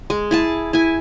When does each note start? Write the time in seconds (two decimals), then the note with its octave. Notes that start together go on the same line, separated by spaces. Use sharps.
0.10 G#3
0.31 E4 G#4 A5
0.73 E4 G#5